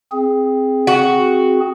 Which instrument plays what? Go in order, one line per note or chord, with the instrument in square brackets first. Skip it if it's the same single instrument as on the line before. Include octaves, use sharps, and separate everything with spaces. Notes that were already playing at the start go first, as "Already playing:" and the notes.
[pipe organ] C4 G#4
[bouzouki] F#4